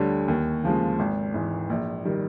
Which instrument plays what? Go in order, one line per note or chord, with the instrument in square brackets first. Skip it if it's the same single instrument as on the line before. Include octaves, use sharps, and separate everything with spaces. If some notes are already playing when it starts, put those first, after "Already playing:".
Already playing: [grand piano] D2 D3 G3 C#5
D#2
C#3 F3 G#3
G#1
G#2 E3
A#1
D#3 G3